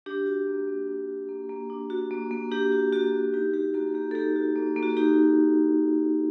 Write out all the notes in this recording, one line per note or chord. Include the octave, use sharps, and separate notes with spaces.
D4 G4
F#4
A#3
A#3
D4
F#4
A#3
A#3
D4
F#4
A#3
A#3
D4 G4
F#4
A#3 F#4
A#3
D#4 G4
F#4 G4
A#3 F#4
A#3 G4
A4
D#4 G4
F#4
A#3
A#3
F#4
D#4 G4